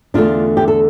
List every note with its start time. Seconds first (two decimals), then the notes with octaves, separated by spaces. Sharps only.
0.14 E2 D3 A3 D4 F4
0.57 G4
0.68 A4